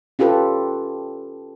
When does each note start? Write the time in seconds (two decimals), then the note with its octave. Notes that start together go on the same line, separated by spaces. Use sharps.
0.19 C#4 F4 G4 A4 B4